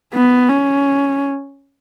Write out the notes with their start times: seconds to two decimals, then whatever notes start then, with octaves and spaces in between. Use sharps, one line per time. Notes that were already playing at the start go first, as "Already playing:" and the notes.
0.14 B3
0.49 C#4